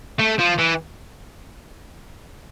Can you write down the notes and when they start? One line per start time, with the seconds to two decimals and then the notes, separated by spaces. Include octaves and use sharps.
0.19 A3
0.39 F3
0.58 E3